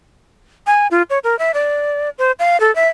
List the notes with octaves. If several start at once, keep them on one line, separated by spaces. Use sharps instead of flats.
G#5
F4
C#5
A#4
E5
D5
C5
F5
A4
E5